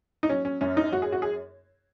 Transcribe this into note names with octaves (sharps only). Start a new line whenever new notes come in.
D#4
F#3 C#4
C#4
F#2 C#4
D#4
F#2 F#4
G#4
F#4
G#4